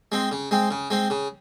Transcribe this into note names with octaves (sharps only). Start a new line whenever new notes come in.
G#3 C4
C#3
G#3 C4
C#3
G#3 C4
C#3